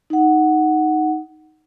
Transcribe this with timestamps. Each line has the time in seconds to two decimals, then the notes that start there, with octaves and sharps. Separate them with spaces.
0.10 D#4 F#5